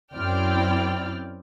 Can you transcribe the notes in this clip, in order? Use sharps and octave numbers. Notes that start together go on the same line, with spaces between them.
F#2 C4 E4 D5 G5 F6